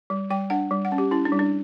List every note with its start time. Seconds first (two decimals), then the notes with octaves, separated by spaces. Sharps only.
0.10 G3
0.30 G3 G5
0.50 D4 F#5
0.71 G3
0.85 F#5
0.92 C#4
0.98 G4
1.11 C#4 E4
1.25 D4
1.32 G3
1.39 D4